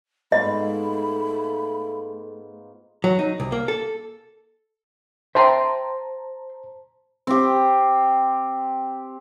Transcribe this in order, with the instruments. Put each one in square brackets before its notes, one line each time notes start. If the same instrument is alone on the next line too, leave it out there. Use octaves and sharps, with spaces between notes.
[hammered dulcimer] G#2 B3 F4 [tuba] A3 [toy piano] D#5 [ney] B5
[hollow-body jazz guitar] F#3
D#4
C2
A#3
A4
[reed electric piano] C5 A5 A#5 [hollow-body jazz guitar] E5 G5 C6
[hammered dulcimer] C4 G4